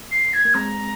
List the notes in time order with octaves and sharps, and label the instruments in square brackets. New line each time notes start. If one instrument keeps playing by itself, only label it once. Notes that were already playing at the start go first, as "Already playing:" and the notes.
Already playing: [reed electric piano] A#3
[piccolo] C7
G#6
[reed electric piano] A#3
[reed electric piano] G#3 C4 [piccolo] A#5